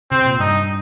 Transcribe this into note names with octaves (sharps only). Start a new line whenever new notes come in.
C3 C4
A#2
G2 D#4